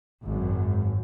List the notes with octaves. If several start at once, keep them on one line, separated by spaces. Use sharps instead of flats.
G#1 F#2